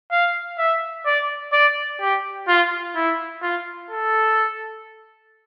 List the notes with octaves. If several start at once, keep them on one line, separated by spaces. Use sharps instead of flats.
F5
E5
D5
D5
G4
F4
E4
F4
A4